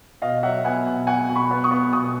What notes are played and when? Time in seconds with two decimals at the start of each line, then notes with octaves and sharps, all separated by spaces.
0.22 B2 D#5 F5
0.43 F#3 E5 F#5
0.64 B3 F#5 G#5
0.86 B2
1.07 B2 F#5 G#5
1.29 B2
1.36 B5 C#6
1.51 B3
1.64 C#6 D#6
1.71 B3
1.92 B2 C#6 D#6